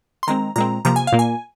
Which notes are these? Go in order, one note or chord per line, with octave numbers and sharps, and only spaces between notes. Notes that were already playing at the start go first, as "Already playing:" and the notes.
C6
D#3 G#3 C4 A#5
A#2 G#3 C4 A#5
C3 F3 A#3 A#5
G#5
F5
A#2 A#3
G#5